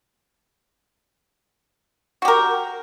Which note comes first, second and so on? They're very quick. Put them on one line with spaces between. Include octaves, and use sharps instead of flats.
F#4 G4 A#4